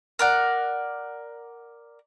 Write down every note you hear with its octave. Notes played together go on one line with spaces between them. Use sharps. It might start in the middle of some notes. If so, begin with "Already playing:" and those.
A#4 D5 F#5